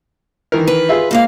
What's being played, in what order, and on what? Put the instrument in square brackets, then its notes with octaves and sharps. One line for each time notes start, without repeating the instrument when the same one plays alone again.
[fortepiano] D#3 E3 A#4
[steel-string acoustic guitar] B4
[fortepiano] F4 G#4 E5
[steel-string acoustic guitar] G#2 A#3 F5